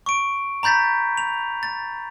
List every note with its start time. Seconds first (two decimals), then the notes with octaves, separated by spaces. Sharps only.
0.06 C#6 D7
0.63 A#5 B5 G6 A6 B6
1.17 F7
1.63 A6